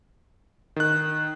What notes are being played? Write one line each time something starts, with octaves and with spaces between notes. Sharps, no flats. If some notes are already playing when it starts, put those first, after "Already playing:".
D#3 F#6